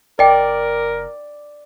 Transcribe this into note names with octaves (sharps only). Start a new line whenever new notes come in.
F#1 A#4 D5 D#5 G5